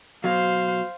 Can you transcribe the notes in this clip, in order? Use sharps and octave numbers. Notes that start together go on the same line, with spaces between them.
B2 F#3 C5 F5